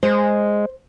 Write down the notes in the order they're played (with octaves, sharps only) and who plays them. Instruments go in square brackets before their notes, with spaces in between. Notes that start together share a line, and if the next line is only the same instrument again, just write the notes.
[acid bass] G#3 [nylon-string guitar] C5